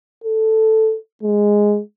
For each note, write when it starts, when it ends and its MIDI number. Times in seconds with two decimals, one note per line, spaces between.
0.24 0.96 69
1.23 1.80 56